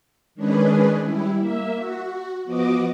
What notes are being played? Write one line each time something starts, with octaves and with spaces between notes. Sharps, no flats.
D#3 G#3 C#4 D4 G#4 B4
G3 E4
A#3 E5
F#4
F3 B3 F#4 D#5 D6